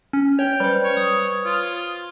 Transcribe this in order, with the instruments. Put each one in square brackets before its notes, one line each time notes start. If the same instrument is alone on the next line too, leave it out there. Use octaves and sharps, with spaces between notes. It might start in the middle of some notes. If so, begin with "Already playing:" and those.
[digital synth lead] C#4
[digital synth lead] C#5 [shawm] G5
[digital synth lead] G3 [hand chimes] B4 C5
[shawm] C#5
[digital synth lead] D#6
[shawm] F4